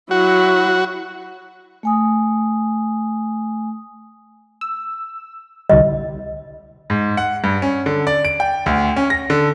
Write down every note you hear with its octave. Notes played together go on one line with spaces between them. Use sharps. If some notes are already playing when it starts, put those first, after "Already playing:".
F#3 E4 F#4
A3 G#5 D#6
E6
C2 D3 G3 D#5
G#2
F#5
G2
C#4
D3
D5
D7
G5
D2
C#4
A#6
D3